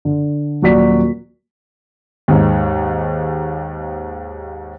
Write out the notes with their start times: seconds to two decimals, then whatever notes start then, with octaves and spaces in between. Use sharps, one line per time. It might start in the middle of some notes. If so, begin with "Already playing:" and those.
0.05 D3
0.62 D#1 F#3 F#4 D5 B6
2.28 D#2 G#2